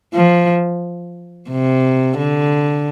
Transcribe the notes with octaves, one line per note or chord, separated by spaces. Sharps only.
F3
C3
D3